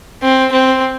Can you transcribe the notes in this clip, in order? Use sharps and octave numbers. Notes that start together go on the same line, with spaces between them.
C4
C4